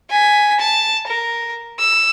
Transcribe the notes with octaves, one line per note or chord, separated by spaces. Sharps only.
G#5 B6
A5
A#4
E6